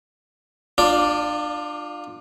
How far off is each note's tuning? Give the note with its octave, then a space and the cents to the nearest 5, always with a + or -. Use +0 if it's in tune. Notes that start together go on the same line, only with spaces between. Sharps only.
D4 +35 F4 +15 D5 +0